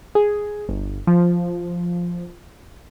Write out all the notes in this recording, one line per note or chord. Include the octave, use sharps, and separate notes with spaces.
G#4
G1
F3